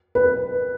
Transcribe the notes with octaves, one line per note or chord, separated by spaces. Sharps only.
B4